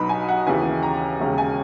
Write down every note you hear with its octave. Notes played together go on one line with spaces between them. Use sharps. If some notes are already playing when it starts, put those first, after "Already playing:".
Already playing: B1 B2 F#3 B3 D#4 B5
G#5
F#5
D#2 C#3 E3 B3 G#5
A#5
E1 D#2 C#3
G#5